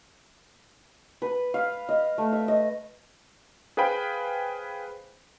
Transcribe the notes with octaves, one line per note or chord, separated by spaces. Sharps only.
B4
F5
D#5
A3
E5
D#5
G#4 B4 C5 F5 G5 B5